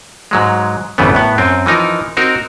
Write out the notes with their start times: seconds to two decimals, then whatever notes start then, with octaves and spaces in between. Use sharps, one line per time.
0.31 G#2 F#3 G#3
0.98 G#1 F#2 C#3 E3 A3 B3
1.15 A2 B3
1.38 F#2 C4
1.66 E3 F3 D#4 A#4
2.17 C4 D#4 F#4 A#4